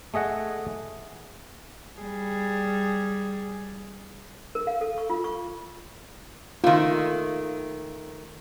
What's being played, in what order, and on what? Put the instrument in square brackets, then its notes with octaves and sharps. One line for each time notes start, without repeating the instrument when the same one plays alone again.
[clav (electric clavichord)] A3 G#4 D#5 F#5
[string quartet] G3 G#4
[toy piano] A#4
F5
A4
C#6
F4
C#6
[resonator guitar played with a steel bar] D#3 A3 [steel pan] F4